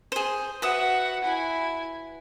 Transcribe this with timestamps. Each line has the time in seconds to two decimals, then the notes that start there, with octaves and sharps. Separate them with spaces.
0.12 G#4 C5
0.62 F#4 B4 E5 F#5 D#6
1.24 E4 G#5